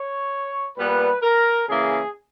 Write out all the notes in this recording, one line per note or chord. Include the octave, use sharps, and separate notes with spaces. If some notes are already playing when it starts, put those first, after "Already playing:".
Already playing: C#5
A#2 G3 B3 B4
A#4
C#3 E3 A#3 G#4